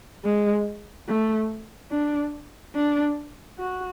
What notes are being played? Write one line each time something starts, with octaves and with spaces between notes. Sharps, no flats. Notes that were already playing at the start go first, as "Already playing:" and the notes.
G#3
A3
D4
D4
F#4